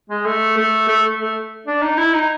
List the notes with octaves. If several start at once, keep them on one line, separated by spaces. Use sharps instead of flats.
G#3
A3
A3
A3
A3
D4
D#4
E4
D#4